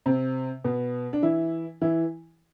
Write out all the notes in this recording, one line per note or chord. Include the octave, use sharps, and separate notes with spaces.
C3 C4
B2 B3
D4
E3 E4
E3 E4